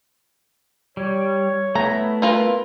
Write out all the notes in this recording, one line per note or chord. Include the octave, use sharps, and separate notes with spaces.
G3 C#5
A3 B3 E4 A#5
A#3 F4 B4